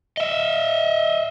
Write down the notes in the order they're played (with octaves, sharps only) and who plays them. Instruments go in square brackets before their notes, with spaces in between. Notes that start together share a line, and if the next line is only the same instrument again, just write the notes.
[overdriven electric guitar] D#5 E5